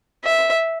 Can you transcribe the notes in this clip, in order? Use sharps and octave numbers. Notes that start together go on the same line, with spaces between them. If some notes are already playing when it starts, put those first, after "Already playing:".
E5